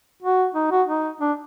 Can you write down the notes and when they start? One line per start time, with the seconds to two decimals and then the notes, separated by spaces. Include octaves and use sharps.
0.23 F#4
0.55 D#4
0.71 F#4
0.88 D#4
1.21 D4